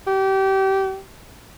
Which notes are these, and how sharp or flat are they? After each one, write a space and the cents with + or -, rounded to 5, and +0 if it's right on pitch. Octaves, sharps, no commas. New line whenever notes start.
G4 -25